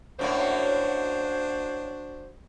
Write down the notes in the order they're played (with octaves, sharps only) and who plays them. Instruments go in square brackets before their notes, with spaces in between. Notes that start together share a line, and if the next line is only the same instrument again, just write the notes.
[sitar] F#2 A2 A#3 [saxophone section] D4 F#4 C5